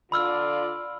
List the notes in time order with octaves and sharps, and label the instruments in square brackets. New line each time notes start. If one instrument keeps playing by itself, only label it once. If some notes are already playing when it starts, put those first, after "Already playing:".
[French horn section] D3 F4 D5 [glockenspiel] B5 E6 F6